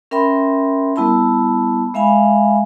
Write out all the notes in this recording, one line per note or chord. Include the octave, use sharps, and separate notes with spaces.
C#4 A#4 E5 G5 B5 C6
G3 B3 E4 A5 B5
G#3 E5 F5 G#5 B5